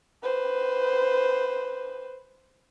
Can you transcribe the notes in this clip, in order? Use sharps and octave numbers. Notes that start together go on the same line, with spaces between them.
B4 C5